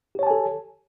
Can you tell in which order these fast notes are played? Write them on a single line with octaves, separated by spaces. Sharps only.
G4 C#5 A5 G#5 A4